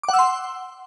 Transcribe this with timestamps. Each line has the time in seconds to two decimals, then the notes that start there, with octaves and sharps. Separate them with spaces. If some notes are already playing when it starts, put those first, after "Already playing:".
0.03 D6
0.08 F#5
0.14 E6
0.19 C6